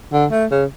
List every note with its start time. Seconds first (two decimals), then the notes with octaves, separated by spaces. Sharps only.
0.12 D3
0.31 A3
0.51 C#3